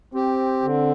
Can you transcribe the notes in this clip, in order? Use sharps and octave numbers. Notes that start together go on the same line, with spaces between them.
C4 G4
D3